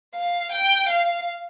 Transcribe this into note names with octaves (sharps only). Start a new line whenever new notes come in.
F5
G5
F5